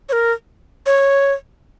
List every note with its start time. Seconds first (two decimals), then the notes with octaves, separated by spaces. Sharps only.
0.09 C#5
0.13 A#4
0.86 C#5